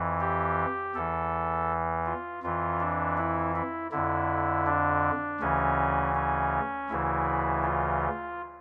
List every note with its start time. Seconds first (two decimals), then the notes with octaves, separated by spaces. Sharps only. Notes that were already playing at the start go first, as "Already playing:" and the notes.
Already playing: F2 E3
0.20 G4
0.95 E2 E3 A4
2.06 F4
2.43 F2 E3 F4
2.80 D4
3.18 E4
3.56 E4
3.92 F2 D3 E4
4.67 D4
5.41 D2 C#3 E3 C#4
6.15 C#4
6.90 D2 C#3 E3 E4
7.64 F4